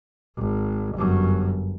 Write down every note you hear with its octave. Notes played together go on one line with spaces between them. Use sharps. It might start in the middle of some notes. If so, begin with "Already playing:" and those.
G#1
G1 F#2